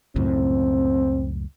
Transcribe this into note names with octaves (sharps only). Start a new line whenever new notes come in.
C#2 F#2 A2 C4